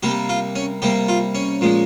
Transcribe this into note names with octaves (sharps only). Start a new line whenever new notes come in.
C3 G3 A#3 G4
F4
C#4
C3 G3 A#3 G4
F4
C#4
A#2 F3 G#3